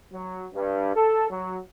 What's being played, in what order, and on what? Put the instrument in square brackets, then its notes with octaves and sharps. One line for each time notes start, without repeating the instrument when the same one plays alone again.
[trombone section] F#3
G2
A4
F#3